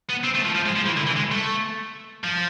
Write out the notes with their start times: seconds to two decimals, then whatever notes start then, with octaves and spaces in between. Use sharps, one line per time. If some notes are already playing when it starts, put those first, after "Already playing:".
0.10 B3
0.24 C4
0.35 A3
0.45 F3
0.55 F3
0.66 G#3
0.76 F3
0.86 E3
0.97 D3
1.06 E3
1.17 G#3
1.32 A3
2.24 F3